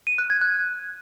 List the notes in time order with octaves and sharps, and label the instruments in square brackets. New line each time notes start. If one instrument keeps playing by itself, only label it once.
[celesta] D#7
F#6
G#6
F#6